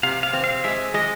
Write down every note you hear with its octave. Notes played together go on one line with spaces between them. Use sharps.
C3 F5
F5
C4
F5
G#3 E5
G#3 D#5